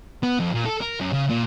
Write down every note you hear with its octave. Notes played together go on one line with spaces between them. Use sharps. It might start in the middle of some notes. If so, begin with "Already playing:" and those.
B3
F2
A#2
A4
A#4
F#2
C#3
A#2